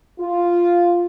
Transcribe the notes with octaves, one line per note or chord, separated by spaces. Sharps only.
F4